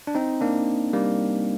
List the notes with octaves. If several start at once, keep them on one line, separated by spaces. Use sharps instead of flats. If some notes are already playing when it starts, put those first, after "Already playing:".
D4
C4 D#4
A#3 D4
G3 A#3